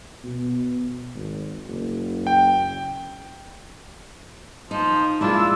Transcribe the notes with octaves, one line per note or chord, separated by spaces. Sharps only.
B2
G#1
F#1
G5
F3 D#4
G#3 A#3 D4 E4 F4 E6